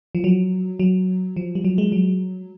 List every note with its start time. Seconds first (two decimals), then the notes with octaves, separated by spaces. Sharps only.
0.15 F3
0.24 F#3
0.79 F#3
1.36 F3
1.55 G3
1.64 F#3
1.78 G#3
1.92 F#3